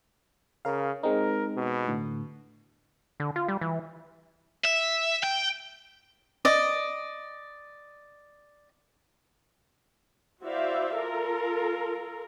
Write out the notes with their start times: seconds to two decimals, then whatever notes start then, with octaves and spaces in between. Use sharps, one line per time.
0.65 C#3 A#4 F5
1.03 G#3 C4 D#4 A#4
1.56 B2
1.87 A2 D3
3.20 D3
3.36 F4
3.48 G3
3.61 E3
4.65 E5
5.24 G5
6.45 D5 D#5
10.42 E4 F#4 C5 D5 E5 F5
10.96 F4 A4 A#4